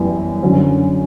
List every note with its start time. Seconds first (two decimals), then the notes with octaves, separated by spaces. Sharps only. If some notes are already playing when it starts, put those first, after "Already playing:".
Already playing: F#2 E3 G3 B3
0.43 F#2 D3 F#3 C#4